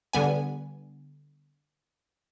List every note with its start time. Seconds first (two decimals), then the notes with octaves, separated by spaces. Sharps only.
0.13 D3 G3 B3 G#5